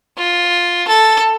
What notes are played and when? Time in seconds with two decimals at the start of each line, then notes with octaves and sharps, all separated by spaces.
0.17 F4
0.88 A4